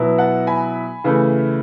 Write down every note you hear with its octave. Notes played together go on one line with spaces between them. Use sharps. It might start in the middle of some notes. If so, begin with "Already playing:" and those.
Already playing: B2 F#3 B3 E4
F#5 A5
G#5 B5
C#3 E3 A3